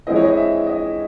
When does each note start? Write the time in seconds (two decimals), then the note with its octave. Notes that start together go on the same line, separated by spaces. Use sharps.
0.07 E3 G#3 C4 E4 D#5
0.16 C#5
0.25 D#5
0.37 E5
0.67 D#5